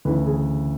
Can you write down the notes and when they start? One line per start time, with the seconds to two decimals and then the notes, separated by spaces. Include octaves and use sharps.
0.05 D2 C#3 E3 B4
0.27 G#4